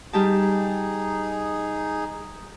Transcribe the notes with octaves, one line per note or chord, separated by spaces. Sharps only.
G3 D#4 G4 G#4 A5